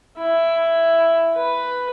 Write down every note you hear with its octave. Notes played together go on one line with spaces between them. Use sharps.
E4
B4